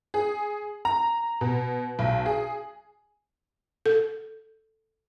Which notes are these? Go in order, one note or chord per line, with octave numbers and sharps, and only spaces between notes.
G#4
A#5
B2
B1
G#4
A4